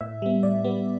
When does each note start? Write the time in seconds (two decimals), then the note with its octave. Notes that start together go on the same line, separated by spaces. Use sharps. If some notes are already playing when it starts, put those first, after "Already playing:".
0.01 A2 E5
0.22 G3 B3
0.43 A2 D5
0.64 G3 B3